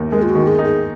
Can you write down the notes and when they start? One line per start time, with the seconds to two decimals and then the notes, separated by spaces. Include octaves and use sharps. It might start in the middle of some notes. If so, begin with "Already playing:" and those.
Already playing: D#2 D#3 D#4
0.12 G#3 A#4
0.22 F4
0.29 F#4
0.35 D#3
0.47 G#4
0.58 D#4
0.64 G#4